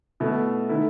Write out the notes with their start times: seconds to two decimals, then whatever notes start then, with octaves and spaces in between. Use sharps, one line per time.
0.20 B2 A3 E4
0.69 D#3 A3 E4